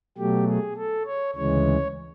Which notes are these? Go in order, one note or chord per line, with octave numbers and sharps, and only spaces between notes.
B2 F#3 A3 G4
G#4
A4
C#5
D2 C#3 E3 G#3 C#5